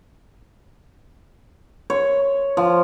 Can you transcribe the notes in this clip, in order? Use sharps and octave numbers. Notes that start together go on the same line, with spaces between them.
C#5
F3